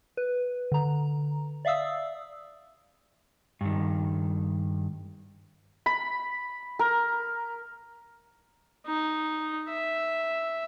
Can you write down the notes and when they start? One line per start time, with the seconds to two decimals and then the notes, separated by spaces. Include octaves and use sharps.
0.17 B4
0.72 D3 A#5
1.65 D5 E5 F5 D#6 E6
3.61 G2 D#3
5.86 B5
6.79 A#4
8.86 D#4
9.69 E5